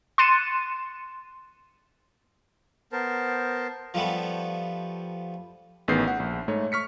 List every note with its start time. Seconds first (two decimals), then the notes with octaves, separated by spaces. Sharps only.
0.18 C6 F#6 A6 C#7 D#7 E7
2.92 B3 A#4 C5 A5
3.94 F3 G3 A3 B3
5.88 A1 D#3 B3 G#4 G6 C7
6.08 F#5
6.19 A#1
6.48 G#2 A3 C#5
6.72 C#6 F6 B6 C#7